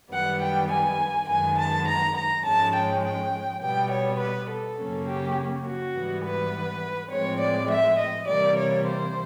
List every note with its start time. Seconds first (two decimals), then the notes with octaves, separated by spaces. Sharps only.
0.12 F#2 D#3 G3 B3 F#5
0.41 G5
0.71 G#5
1.28 F#2 D#3 G#3 B3 G#5
1.58 A5
1.87 A#5
2.16 A#5
2.44 G#2 F3 G#3 C#4 A5
2.74 G5
3.03 G5
3.61 B2 G3 B3 G5
3.91 C#5
4.20 B4
4.49 A4
4.78 F#2 C#3 F#3 A#3 C#4
5.07 G4
5.65 F#4
5.95 G#2 E3 G3 B3
6.24 B4
7.11 A2 F3 G#3 C4 C#5
7.40 D5
7.69 E5
7.98 D#5
8.28 C3 E3 G3 A#3 D5
8.57 C#5
8.86 C5